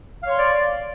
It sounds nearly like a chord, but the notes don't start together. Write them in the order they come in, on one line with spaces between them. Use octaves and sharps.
F5 C#5 C6 D5